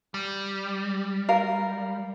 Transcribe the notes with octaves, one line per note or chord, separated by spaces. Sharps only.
G3
A#4 F5